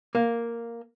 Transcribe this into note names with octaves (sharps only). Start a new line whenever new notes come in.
A#3